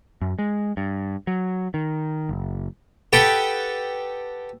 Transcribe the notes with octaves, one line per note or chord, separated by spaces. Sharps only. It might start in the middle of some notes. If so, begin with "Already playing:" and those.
F#2
G#3
G2
F#3
D#3
F#1
G4 A4 B4 F#5 G5 D#6